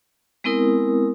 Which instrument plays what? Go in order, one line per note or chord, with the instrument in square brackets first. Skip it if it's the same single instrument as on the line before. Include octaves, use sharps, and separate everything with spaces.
[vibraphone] G#3 B3 C4 E4 A#4 D#6